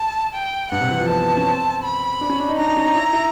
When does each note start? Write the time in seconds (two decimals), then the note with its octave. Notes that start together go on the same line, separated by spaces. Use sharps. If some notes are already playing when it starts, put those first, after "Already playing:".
Already playing: A5
0.34 G5
0.72 G2 F#5
0.81 C3
0.91 E3
1.00 F3
1.09 B3 A5
1.37 C#4
1.47 C4
1.84 B5
2.21 D4
2.30 C#4
2.40 D4
2.48 D#4
2.58 D4 A#5
2.67 D#4
2.77 C#4
2.85 D4
2.95 E4
3.13 E4